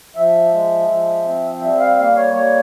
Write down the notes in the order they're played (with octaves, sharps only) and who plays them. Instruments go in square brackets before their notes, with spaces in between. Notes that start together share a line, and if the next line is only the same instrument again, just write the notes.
[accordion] F3 E5
G#3
F3
C4
G3 E5
F5
A#3 F5
C#5
G3 C#5